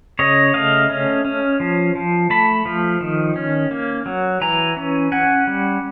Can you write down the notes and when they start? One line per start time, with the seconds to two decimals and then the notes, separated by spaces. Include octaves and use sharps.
0.19 C#3 C#5 D#5
0.54 A3 D#5 F5
0.90 C#4
1.25 C#4
1.60 F3
1.95 F3
2.30 A3 A5 B5
2.66 F3
3.01 D#3
3.36 C#4
3.71 A#3
4.06 F#3
4.41 E3 G#5 A#5
4.77 C#4
5.12 C#4 F#5 G#5
5.47 G3